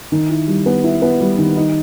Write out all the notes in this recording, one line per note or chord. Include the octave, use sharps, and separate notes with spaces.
D#3
E4
G3
B3
E4
B3
G3
D#3
D#4